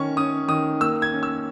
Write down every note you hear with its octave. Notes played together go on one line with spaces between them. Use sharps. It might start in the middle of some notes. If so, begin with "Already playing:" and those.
Already playing: D#3 C#4 C#6
C#4 D#6
D#3 D#6
A#3 E6
G#6
C#4
E6